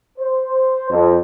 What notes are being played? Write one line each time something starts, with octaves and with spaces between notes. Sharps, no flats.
C5
F2